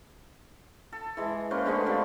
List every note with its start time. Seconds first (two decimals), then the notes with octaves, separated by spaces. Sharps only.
0.93 A4
1.17 E3 G#3
1.51 A#3 C#4 B4 C5
1.66 D3 G#3 A3 B3
1.86 F3 G3 C4